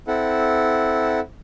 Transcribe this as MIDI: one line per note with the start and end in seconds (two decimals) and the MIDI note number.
0.08 1.20 60
0.08 1.20 64
0.08 1.20 69
0.08 1.20 78